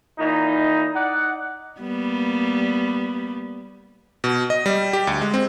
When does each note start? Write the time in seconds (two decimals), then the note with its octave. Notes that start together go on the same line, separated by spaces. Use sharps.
0.18 A#2 E3 D#4
0.94 D#4 D5 F#5
1.80 G3 A#3 B3
4.24 B2
4.50 D#5
4.66 G3
4.93 G4
5.07 D2
5.21 G#3
5.34 C4